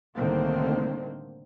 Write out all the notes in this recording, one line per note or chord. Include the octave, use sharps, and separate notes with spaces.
C2 A2 D3 D#3 A#3 C4